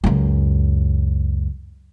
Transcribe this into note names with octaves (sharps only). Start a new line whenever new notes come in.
C#2 F#2